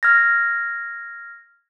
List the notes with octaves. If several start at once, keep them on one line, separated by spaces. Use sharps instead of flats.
F6 G#6 A#6